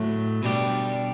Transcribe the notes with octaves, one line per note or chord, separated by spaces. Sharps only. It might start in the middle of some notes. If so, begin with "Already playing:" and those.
Already playing: A2 F#3 A3
B2 G3 D4 G4